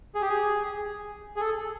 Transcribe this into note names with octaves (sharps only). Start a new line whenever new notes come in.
G#4
G4
G#4
G#4
A4